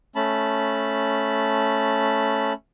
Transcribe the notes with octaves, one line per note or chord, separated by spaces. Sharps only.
A3 C#4 A5 B5